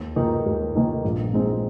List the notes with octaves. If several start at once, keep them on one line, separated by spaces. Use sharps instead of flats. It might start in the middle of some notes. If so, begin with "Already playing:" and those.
Already playing: D#2
D#3 A#3 D#4
D#2
D#3 A#3 D#4
A#1
A#2 G#3 C4 D#4